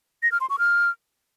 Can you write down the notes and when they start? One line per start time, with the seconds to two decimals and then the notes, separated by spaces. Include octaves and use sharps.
0.23 A#6
0.32 F6
0.41 C6
0.50 C#6
0.59 F6